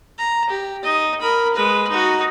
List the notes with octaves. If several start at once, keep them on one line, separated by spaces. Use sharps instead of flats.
A#5
G4
D#4 D#5
A#4 B5
G#3 B4
D#4 F#4